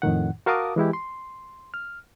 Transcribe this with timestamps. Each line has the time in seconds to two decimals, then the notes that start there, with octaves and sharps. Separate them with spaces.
0.02 F2 A2 D#3 F#5
0.46 F#4 A#4 F5 A5 D6 D#6
0.76 E3 G#3 E4 G4
0.93 C6
1.74 F6